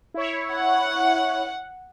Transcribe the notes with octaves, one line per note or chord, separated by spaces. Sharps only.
E4 C#5
F#5